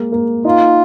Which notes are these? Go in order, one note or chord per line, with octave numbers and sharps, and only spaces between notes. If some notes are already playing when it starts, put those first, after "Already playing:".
Already playing: G#3 A#3
A#3
D#4 F4